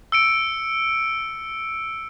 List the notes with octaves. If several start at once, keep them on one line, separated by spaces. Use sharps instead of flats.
E6 C#7 D7